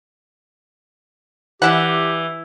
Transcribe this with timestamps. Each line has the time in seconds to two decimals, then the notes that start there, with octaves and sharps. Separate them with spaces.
1.62 E3 D4 E4 G4 F#5